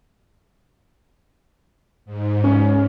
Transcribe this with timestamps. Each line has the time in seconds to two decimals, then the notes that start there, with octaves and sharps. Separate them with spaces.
2.05 G#2
2.44 C#4